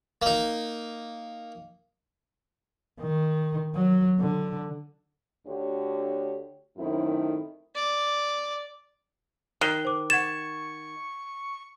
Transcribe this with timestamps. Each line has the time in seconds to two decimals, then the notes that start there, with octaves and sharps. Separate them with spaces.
0.22 A#3 D#4
3.01 D#3
3.75 F#3
4.20 D3
5.47 D2 D3 F#4 G4 C#5
6.77 F#2 A2 D#3 A3 C4 E4
7.75 D5
9.61 D#3 F#6 C7 G7
9.85 C5 D6
10.10 F#5 C#6 G#6 A6 E7